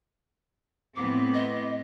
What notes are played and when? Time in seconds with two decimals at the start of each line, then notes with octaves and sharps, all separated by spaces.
0.95 A2 B3 C4 D6
1.33 D#5